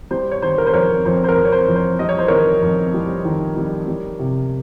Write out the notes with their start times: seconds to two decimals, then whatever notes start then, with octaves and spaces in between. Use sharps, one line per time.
0.11 G3 C5
0.32 C#5
0.42 D#3 C5
0.58 A#4
0.67 C5
0.73 F2 A#4 C#5
1.05 F2 C5
1.24 C5
1.29 A#4
1.37 F2
1.45 C#5
1.52 C5
1.68 F2
1.75 C5
1.99 G3 D#5
2.09 C#5
2.19 C5
2.28 D#3 A#4 C#5
2.62 F2
2.94 G3
3.25 D#3
3.56 G3
3.88 G3
4.19 C3